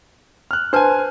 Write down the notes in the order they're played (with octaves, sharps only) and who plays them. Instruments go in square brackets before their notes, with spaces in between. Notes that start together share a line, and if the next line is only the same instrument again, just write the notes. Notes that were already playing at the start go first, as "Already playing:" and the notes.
[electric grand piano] F6 F#6
[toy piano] D4 B4 A5 [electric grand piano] C5 G#5